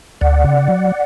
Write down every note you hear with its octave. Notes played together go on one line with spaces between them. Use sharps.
D2 D5 F#5
C#3
F#3